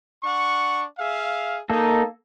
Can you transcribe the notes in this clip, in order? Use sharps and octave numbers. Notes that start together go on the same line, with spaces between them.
D4 F#5 C#6
G#4 E5 F5
A#3 D#4 A4